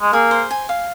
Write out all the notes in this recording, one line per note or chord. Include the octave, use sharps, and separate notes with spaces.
G#3
A#3 G#4
C5
G#5
F5